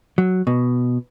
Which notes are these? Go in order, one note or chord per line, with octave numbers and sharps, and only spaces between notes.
F#3
B2